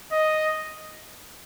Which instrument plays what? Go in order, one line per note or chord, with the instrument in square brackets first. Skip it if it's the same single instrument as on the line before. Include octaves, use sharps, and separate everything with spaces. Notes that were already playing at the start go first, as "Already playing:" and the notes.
[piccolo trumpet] D#5